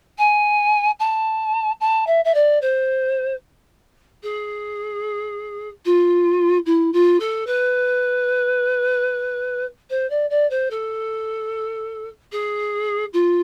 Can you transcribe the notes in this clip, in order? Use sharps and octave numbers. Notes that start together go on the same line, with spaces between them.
G#5
A5
A5
E5
E5
D5
C5
G#4
F4
E4
F4
A4
B4
C5
D5
D5
C5
A4
G#4
F4